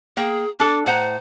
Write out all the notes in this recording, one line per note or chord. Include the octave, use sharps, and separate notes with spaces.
A#3 G#4 G5
D4 A4 D6
A2 C5 F#5 A#5